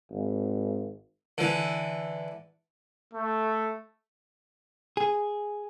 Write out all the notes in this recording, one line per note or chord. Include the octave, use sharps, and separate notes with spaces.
G#1
D3 E3
A3
G#4